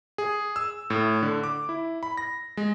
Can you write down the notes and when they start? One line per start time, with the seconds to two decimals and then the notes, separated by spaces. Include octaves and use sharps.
0.18 G#4
0.56 E6
0.90 A2
1.23 D3
1.43 D6
1.69 E4
2.03 B5
2.17 A#6
2.57 G#3